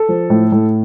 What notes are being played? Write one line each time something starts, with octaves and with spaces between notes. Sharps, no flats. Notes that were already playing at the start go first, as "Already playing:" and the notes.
Already playing: A4
F3
A2
A2